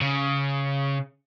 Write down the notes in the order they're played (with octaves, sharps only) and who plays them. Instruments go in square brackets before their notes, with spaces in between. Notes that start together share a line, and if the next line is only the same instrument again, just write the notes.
[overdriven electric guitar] C#3